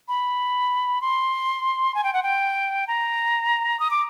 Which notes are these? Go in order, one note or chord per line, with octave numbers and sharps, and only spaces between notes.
B5
C6
G#5
G5
F#5
G5
A#5
D#6
D6